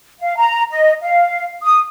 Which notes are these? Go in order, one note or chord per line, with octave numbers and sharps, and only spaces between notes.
F5
A#5
D#5
F5
D#6